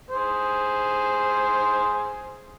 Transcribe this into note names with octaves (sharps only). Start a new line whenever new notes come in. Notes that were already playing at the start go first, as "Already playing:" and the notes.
G#4 C5